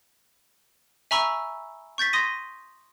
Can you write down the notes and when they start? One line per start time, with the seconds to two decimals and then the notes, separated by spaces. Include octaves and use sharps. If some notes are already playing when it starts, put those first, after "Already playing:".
1.11 E5 G#5 A#5 B5 C#6 E6
1.98 C#6 G6 A6 B6
2.13 C6 D#6 A#6 D#7